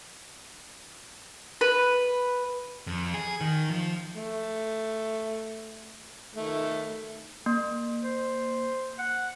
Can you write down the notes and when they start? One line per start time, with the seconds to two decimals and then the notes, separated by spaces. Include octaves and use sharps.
1.61 B4
2.87 F2
3.14 G#4
3.41 D#3
3.71 F3
4.15 A3
6.35 D#3 A3
7.46 A#3
8.03 C5
8.99 F#5